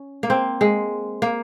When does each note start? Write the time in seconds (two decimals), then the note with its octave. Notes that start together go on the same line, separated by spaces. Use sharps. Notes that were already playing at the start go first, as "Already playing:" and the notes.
Already playing: C#4
0.23 A#3
0.30 C4
0.61 G#3
1.22 A#3